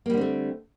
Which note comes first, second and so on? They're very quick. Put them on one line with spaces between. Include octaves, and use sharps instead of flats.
A#3 G3 D3 C4 A3